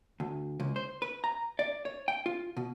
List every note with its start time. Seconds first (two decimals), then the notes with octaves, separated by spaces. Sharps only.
0.20 D2
0.60 C#2
0.76 C5
1.02 B4
1.24 A#5
1.59 D5
1.85 C#5
2.08 G5
2.26 F4
2.57 B2